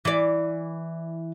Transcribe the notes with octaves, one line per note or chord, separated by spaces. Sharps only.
E3 D5